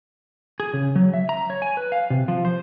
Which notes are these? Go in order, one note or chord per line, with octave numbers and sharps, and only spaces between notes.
G#4
C#3
F#3
E5
A#5
C#5
G#5
B4
F5
C3
F3
C5